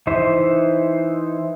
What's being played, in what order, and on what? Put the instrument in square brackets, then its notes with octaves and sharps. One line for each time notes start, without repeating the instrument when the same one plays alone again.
[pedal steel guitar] E3 D#4 C5 E5